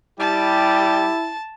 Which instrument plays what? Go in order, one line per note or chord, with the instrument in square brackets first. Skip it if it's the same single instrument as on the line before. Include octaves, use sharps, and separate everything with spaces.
[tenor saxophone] G3 [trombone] E4 [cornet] G4 [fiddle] A5